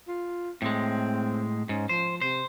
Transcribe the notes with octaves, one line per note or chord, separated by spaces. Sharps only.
F4
A2 G#3 C4
G#2 C#4
F3 C5
C3 C5